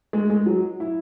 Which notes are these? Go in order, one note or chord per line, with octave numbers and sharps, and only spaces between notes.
G#3
G#3
F#3
E4